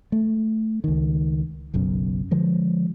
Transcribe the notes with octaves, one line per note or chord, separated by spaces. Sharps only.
A3
C#2 D#3
F#1 B1 F#2
D3 F3 G#3